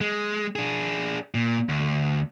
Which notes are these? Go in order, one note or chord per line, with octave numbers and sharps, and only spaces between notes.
G#3
D4 G#4
A#2
D2